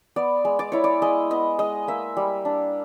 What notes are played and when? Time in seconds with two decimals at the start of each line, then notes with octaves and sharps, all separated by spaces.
0.16 B3 D5
0.45 G#3
0.59 D5
0.72 E4 C#5
0.84 D5
1.02 G#3 D#5
1.30 B3 D#5
1.59 G#3 D#5
1.88 A#3 E5
2.17 G3
2.45 D4